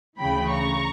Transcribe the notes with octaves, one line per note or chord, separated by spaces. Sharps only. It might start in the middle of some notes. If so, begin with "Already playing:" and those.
D2 C#3 E3 G5 B5
A#5 C#6